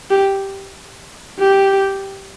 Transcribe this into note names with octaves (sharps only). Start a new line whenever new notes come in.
G4
G4